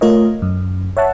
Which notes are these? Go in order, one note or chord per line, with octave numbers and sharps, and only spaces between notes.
A3 F4 A#4 C#5 D#5
F#2
C#5 E5 F#5 A5